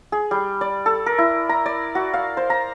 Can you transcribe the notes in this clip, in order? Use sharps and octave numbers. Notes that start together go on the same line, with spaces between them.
G#4
G3
D5
A4
A#4
E4
A#5
D5
F#4
F5
C5
A#5